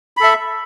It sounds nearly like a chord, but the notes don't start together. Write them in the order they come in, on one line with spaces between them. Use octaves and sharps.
B5 A4 E5